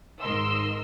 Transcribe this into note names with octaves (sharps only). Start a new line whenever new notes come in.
G#1 G#2 A#4 D#5 C6 E6